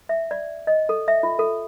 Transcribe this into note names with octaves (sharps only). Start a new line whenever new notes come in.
E5
D5
D#5
A4
E5
F4
A4